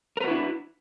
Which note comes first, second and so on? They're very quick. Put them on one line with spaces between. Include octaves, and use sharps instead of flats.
A#4 B4 F#4 E4 D4